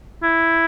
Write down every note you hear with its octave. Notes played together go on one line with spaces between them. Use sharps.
E4